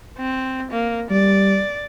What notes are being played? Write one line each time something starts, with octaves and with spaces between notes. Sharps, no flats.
C4
A#3
G3 D5